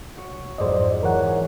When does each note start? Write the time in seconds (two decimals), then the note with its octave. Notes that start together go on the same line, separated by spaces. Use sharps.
0.17 F#4 C#5
0.31 C2
0.58 F2 G#2 F#3 C5 D5 D#5
1.03 E3 A#4 C#5 F#5
1.20 G#5